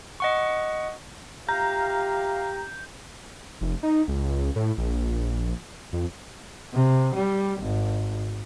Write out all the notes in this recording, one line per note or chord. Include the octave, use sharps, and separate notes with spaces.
D#5 F#5 C#6
F4 G4 E5 F5 A#5 G6
F1
D#4
C#2
A2
A#1
F2
C3
G3
G#1